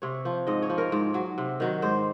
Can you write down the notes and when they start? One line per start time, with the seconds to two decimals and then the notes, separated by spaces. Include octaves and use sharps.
0.02 C3 C#5
0.25 F3
0.47 G#2 D#5
0.62 C#5
0.70 F3
0.78 A#4
0.92 G#2
1.14 F#3
1.38 C3
1.60 D#3 F#3
1.82 G#2 C5